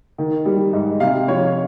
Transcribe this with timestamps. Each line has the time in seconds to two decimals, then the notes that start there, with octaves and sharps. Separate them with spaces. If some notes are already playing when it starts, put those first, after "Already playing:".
0.18 D#3
0.46 G3
0.73 G#2
1.00 C3 F5
1.28 F3 C#5